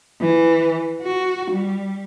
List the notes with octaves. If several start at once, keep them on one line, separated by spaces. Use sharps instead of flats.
E3
F#4
G3